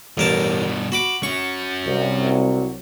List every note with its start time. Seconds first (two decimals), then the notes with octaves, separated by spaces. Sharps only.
0.18 A1 G2 B2 A#4 A5
0.92 F#4 B5 D6
1.23 C#4 F#4 C#6
1.85 C2 F#3